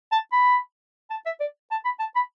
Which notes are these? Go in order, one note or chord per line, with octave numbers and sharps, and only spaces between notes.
A5
B5
A5
E5
D5
A5
B5
A5
B5